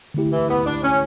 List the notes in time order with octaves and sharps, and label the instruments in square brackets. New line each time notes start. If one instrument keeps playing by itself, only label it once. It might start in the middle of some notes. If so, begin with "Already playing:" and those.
[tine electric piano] D3 A3 E4 G4
[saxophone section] E3
B3
D4
C#4